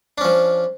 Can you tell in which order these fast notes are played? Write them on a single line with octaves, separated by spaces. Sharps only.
D4 C#4 F3